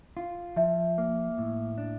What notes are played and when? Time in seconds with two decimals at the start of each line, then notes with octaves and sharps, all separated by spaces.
0.17 F4
0.56 F3 E5
0.98 A#3
1.38 A2
1.78 D4